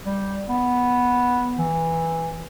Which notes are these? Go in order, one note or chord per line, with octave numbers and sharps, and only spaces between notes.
G3
B3
E3